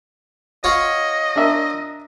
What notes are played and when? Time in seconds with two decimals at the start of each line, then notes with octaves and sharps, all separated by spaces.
0.64 F4 C#5 D#5 F#5
1.36 D4 A#4 E5